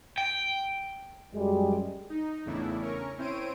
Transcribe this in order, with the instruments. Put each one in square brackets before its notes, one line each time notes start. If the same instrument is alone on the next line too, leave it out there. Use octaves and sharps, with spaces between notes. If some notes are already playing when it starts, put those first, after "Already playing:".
[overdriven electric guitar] G5
[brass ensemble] F#2 G3 G#3
[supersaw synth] D#4
E2 A2 C#3 D4 E4
C#4 A#4 C#6
C4 E4 C5 C#5 D7 D#7